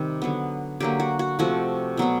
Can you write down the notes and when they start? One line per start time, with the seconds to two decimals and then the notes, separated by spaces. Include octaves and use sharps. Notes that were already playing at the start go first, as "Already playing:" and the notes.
Already playing: C3 D#3 G3
0.22 D3 F#3 B3
0.80 D3 F#3 A#3 G4
1.00 F#4
1.19 F#4
1.39 C3 F3 A3 F#4
1.97 B2 F#3 B3